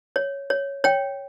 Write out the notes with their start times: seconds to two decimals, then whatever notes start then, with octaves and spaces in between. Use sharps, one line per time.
0.16 C#5
0.50 C#5
0.84 C#5 G5